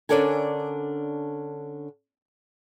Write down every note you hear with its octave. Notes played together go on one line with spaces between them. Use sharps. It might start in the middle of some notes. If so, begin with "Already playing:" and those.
D3 C#4 D4 A4 A#4 G#5